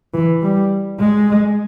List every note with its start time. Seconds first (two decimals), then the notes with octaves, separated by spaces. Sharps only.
0.14 E3
0.42 G3
1.00 G#3